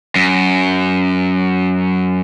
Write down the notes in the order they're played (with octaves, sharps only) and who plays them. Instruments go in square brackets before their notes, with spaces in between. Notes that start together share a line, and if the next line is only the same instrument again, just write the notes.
[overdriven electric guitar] F#2